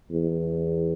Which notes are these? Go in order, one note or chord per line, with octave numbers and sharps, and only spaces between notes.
E2